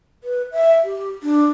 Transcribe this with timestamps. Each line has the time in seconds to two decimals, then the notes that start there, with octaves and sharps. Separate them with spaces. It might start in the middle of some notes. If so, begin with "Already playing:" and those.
0.24 B4
0.52 E5
0.84 G4
1.23 D4